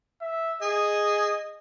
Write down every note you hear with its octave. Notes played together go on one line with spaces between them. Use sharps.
E5
G#4 D#5